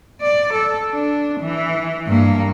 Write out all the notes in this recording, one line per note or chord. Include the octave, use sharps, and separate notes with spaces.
D5
A4
D4
E3
G2 A#3